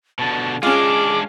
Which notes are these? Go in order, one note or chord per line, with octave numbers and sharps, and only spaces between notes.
B2 D3 A5
G#3 C#4 D4 F4 G#4 D6